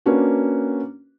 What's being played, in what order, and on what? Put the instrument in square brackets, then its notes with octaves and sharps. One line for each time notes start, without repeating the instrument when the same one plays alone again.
[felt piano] A#3 C#4 D4 F#4 B4